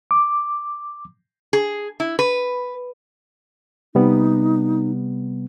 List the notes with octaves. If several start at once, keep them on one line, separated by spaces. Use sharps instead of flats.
D6
G#4
E4
B4
C3 G3 B3 D#4